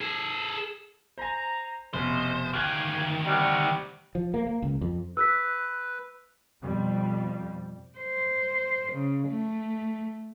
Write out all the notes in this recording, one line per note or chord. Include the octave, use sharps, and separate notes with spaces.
G#4 A4
C5 G#5 A#5
F1 B2 C#4 B4 C5 D#5
D2 D#3 G4 F5 G#5 F6 F#6 G#6
C3 G3 D#4 F#5
F3
A#3
A#3
C#2
F2
B4 E6 F#6 B6
F2 B2 G3
C5
C#3
A3